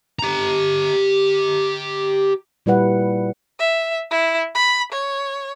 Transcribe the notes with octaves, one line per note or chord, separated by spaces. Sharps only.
G4 A#5
A#2 G3 E4 B4 F#5
E5
E4
B5
C#5